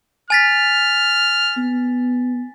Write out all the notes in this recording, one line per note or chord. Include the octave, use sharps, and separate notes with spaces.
G#5 F6 A6 B6
B3